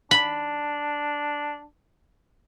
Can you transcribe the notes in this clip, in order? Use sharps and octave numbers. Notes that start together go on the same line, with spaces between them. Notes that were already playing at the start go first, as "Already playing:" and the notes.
D4 B5